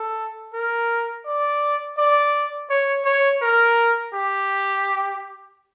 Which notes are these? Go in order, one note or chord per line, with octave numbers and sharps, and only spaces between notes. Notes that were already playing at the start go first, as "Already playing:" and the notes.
Already playing: A4
A#4
D5
D5
C#5
C#5
A#4
G4